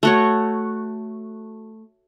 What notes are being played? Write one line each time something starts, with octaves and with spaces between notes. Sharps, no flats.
A3 F#4 C#5